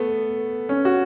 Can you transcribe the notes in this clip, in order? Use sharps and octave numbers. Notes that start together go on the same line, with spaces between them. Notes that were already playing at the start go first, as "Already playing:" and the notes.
Already playing: A3 B3
C#4
F#4